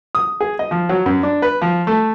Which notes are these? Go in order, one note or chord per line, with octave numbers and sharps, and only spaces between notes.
D#6
G#4
D#5
F3
F#3
F#2
D4
B4
F3
A3